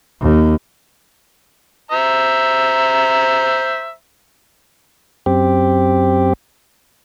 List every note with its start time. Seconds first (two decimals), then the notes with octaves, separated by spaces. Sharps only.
0.21 D#2
1.91 C5 E5 A#5
5.26 F#2 C4 G4